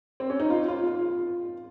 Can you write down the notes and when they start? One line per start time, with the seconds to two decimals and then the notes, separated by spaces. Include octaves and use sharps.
0.20 C4
0.30 C#4
0.40 D#4
0.50 F4
0.68 F4
0.87 F4